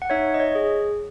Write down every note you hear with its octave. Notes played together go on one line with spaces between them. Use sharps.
F#5
D#4 C#5 E5
D#5
C#5
G#4